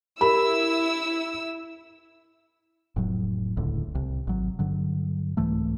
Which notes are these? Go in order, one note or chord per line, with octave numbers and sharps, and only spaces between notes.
E4 G4 A#4 B5 E6
F1 A2 F#3
D#1 C#2 A2 D3
C2
G#1 F#3
G2 D3 F#3
C2 G#2 E3 A3